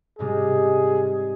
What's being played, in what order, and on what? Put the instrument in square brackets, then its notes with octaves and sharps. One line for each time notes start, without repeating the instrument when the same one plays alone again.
[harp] G#2 C3 G3 [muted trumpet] G#4